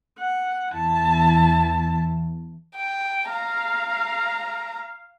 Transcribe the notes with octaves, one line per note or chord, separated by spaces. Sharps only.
F#5
E2 E4 A5
G5
F5 A#5